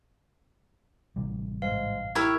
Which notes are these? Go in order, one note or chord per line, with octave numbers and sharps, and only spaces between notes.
A1 C3 G3
G#2 F5
E4 G4 A#4 C#5 G#6